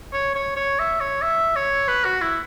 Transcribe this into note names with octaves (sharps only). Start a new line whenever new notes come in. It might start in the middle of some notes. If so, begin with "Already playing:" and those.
C#5
C#5
C#5
E5
C#5
E5
C#5
B4
F#4
E4